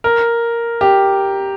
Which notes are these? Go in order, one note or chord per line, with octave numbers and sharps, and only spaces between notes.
A#4
G4